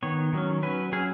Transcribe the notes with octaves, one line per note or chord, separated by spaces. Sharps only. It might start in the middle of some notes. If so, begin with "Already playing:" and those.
D#3 B3 C#5
D#3 F#3 C#4
F#3 C#4 B4
F#3 C#4 G#4